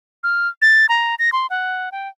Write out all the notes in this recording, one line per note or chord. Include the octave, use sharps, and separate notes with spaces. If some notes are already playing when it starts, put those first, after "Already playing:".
F6
A6
A#5
A#6
C6
F#5
G5